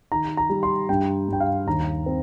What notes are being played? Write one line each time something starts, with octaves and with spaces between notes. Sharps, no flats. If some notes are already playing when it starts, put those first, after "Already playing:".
D#3 A#5
A#5
G3
C6
G2 G5
G2 G5
F5
D#2 A#5
C4